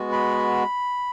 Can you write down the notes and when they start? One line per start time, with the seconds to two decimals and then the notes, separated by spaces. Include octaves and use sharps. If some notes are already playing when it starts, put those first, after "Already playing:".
Already playing: G#3 B3 F#4
0.12 B5